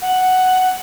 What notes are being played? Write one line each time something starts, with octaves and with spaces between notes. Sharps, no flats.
F#5